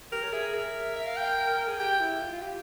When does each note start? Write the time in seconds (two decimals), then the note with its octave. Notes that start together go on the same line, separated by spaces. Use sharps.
0.12 G4 A#4
0.23 C#5
0.33 G#4 E5
0.54 A#4
0.96 E5
1.06 F5
1.17 G5
1.68 G#4
1.79 G4 G5
2.01 E4
2.21 F4
2.33 F4
2.42 G4